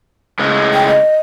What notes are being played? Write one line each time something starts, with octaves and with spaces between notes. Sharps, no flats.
A2 C#3 G#3
G5
D#5